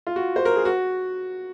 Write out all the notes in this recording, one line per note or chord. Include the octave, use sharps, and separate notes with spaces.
F4
F#4
C5
A#4
G#4
F#4